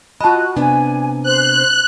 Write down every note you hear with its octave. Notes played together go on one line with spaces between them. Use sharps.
F4 F#4 D#5 A5 B5 F#6
C3 B3 D4 G#5
C5 F#6